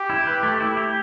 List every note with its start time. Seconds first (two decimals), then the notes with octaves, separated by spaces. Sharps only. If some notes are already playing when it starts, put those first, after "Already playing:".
Already playing: G4
0.10 E4
0.27 B4
0.43 A3
0.60 E4
0.77 G4